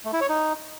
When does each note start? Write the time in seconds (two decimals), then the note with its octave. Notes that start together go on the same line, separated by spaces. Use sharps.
0.05 A3
0.13 E4
0.21 C#5
0.29 D#4